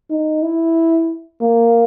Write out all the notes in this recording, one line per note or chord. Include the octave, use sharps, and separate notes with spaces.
D#4
E4
A#3